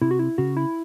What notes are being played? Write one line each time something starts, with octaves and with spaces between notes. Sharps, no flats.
C3 E4
F#4
E4
C#3 F#4
E4